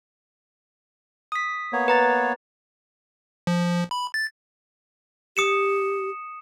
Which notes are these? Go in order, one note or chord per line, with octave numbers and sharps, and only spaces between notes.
D#6 B6
A#3 B3 C#5
B4 A#5 A6
F3
B5
A6
G4 D#6 C#7 E7